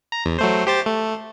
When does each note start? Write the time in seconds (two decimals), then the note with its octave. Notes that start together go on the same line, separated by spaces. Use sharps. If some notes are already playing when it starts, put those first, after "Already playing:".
0.12 A#5
0.26 E2
0.39 F#3 A3 C5
0.67 G4 C5 A6
0.86 A3